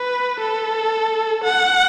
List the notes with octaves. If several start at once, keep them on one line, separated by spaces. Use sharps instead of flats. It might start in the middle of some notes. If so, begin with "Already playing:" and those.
Already playing: B4
A4
F#5